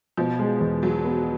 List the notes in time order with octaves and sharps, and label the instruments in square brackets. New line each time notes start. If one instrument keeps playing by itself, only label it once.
[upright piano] B2 [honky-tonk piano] F3
[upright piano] G#3
E2
[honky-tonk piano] F#3 [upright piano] G#3
[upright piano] B3